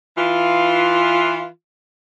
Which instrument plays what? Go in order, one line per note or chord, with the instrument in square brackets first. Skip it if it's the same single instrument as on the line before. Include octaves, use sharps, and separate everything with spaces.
[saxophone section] E3 F4